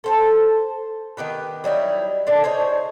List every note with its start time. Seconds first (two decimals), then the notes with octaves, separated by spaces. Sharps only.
0.04 A4 C5 A5
1.17 D#3 B3 G4 B4
1.64 F#3 G3 D#4 E4
2.27 A#2 D3 D4 A5
2.44 D#4 G#4 C5 C#5